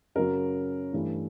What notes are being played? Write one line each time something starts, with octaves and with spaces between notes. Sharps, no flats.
F#2 C#3 F#3 A#4
G2 E3 A3